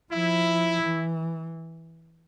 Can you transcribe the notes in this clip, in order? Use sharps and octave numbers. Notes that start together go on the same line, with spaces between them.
F3 E4
E3